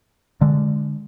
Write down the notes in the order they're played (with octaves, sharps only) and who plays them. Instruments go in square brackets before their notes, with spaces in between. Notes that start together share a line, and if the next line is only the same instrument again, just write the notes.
[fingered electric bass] D3 G#3